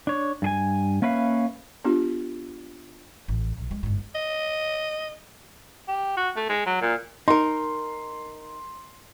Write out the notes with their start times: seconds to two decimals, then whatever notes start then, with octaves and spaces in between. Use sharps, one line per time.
0.07 D4 C#5
0.42 G2 G#4 G#5
1.02 A#3 C#4 B4 E5 F5
1.85 B3 D4 F4 G4
3.28 A1
3.57 B1
3.71 G#3
3.83 G1 G#2
4.15 D#5
5.88 G4
6.17 F#4
6.36 A3
6.49 G#3
6.66 F#3
6.81 A#2
7.28 D#4 A#4 C6